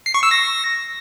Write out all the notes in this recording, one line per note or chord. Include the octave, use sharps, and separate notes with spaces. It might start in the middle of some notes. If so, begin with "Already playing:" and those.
C7
C#6
E6
A#6